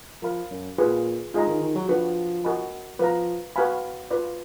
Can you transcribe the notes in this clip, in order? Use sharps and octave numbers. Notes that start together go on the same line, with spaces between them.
F3 A#4 F5 B5
F#2
A#2 F4 G#4 B4
G#2 F4 G#4 D#5 A#5
D#3
D#3
F#3
F3 D4 F#4 B4
F#4 A#4 D#5 G#5 B5
F3 B4 F5 A#5
F#4 B4 F5 G#5 B5
F4 B4 D5